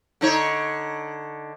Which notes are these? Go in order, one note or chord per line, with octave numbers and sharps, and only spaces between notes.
D3 D#4 C#5